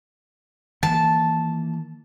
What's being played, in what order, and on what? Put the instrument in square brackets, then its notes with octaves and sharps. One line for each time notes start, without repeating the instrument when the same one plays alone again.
[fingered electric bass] D#3 E3 A#3 [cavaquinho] A5